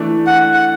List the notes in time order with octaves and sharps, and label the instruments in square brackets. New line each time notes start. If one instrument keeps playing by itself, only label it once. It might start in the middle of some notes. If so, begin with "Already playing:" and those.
Already playing: [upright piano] E3 A3 D4
[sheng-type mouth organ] F#5
F#5